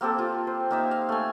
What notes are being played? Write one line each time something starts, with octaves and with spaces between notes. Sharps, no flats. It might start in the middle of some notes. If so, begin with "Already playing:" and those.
A#3 C4 G4 A4
F4
C5
A#3 D#4 E5
F5
A3 G#5